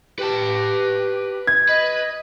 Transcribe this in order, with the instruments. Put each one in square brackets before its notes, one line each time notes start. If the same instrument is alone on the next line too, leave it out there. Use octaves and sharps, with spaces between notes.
[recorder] G4 [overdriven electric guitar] B4 A5
[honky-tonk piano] G#6
[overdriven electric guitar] B4 [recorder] D#5